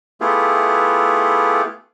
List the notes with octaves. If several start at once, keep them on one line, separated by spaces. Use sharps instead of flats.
A3 B3 E4 F4 G4 G#4